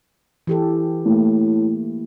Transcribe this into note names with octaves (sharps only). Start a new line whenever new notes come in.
E3 G4 A4
A2 A3 A#3 E4